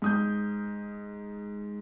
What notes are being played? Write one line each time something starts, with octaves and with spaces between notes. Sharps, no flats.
G#2 D#6 G6